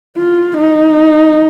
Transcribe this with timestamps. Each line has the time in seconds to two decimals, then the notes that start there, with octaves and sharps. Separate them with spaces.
0.17 F4
0.57 D#4